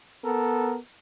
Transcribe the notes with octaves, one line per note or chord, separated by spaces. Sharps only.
B3 A4 A#4